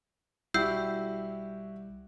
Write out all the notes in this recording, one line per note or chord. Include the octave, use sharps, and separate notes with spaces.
B1 G3 E4 F#4 G4 E6 G6 C7